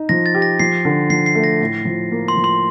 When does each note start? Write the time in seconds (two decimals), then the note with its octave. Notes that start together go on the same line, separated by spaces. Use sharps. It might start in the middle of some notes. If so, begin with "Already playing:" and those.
Already playing: D#4
0.09 F3 A#6
0.26 A6
0.34 G4
0.42 A#6
0.60 F3 C7
0.85 D3
1.10 F3 C7
1.26 C7
1.35 A3
1.44 A#6
1.61 A2
1.85 F3
2.11 A#3
2.28 C6
2.36 F3
2.44 C6